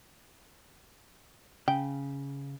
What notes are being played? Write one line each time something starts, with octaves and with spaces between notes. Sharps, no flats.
C#3 G5